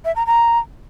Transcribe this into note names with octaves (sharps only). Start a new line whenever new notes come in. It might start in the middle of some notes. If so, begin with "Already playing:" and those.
E5
A#5
A#5